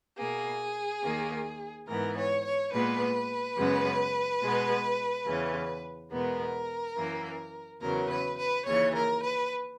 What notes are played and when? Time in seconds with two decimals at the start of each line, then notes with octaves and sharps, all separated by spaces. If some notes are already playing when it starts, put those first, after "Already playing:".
0.17 B2 A#3 G#4
1.02 D#2 D#3 A#3
1.87 G#2 E3 B3 A#4
2.16 C#5
2.44 C#5
2.72 A#2 G#3 B3 B4
3.57 F#2 C#3 G#3 B3
4.42 B2 G#3 B3
5.26 E2 C#3 E3
6.11 E2 B2 G#3 B3 A#4
6.96 F#2 E3 A#3
7.81 E2 C#3 F#3 B3 A#4
8.09 B4
8.37 B4
8.66 D#2 C#3 E3 C#5
8.94 A#4
9.22 B4